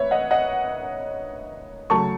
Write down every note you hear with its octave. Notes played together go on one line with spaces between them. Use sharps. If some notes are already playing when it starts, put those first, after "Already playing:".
Already playing: A2 B4 C#5 E5
D#5 F#5
D#5 F#5
C#3 F#3 A3 A5 C#6